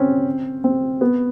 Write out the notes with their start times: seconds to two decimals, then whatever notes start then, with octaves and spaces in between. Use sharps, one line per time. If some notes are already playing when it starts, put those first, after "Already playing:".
Already playing: C4 C#4
0.64 C4
1.01 B3